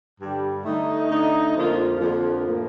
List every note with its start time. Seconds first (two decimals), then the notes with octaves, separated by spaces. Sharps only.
0.19 G2 D3 G3
0.64 D3 A3 D#4
1.10 D3 A3 D#4
1.55 F2 D3 F3 A#3 F4
1.99 F2 D3 F3 A#3 F4
2.44 A2 F3 A#3